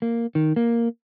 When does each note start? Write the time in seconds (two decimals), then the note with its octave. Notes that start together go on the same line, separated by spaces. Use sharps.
0.02 A#3
0.35 D#3
0.56 A#3